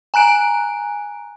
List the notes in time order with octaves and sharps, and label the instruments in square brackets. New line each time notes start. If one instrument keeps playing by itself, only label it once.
[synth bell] G#5 A#5 F#6 D7